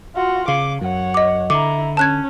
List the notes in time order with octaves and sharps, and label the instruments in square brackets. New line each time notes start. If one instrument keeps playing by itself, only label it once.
[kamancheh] F4 F#4
[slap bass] C#3 [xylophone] F5 [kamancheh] D6
[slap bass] F#2 [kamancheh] C#5 F#5
[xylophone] D#5 D6
[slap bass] D3 [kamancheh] E4 A#5 [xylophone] D6
[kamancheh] C#4 [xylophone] A5 F#6 G#6